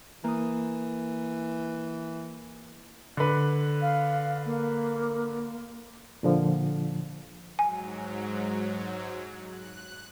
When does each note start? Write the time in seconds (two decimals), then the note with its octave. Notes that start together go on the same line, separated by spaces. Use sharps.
0.24 E3 A#3 D#6
3.17 D3 B4
3.82 F5
4.46 A#3
6.23 A#2 D3 F3
7.59 G#2 F#3 G#5
9.50 F#6